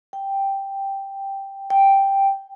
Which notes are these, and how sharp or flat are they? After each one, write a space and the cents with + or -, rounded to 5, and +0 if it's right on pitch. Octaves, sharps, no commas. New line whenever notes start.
G5 +0
G5 +0